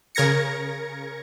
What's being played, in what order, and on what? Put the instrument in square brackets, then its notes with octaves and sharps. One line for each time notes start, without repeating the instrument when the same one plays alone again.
[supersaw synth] C#3 A#4 G#6 A#6 C#7